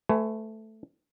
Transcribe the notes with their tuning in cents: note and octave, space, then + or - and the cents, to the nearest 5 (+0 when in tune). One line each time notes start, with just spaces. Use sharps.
A3 +0 B4 +40 G#5 +0